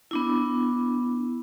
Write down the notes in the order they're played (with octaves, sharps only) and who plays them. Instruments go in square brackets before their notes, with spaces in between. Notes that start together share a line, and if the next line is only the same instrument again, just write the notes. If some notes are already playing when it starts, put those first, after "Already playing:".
[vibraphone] B3 D4 E4